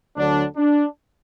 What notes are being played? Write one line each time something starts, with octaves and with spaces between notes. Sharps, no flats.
D2 D3 F#3 D4
D4